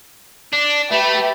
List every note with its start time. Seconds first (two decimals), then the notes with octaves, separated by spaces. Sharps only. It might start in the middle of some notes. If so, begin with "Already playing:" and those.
0.53 D4
0.91 A3 G4 B4 E5